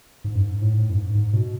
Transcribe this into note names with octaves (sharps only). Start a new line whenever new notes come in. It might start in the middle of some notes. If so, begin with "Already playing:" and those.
G#2
F#2
G#2
A2
G#2
A2
F#2
G#2
G#2
B2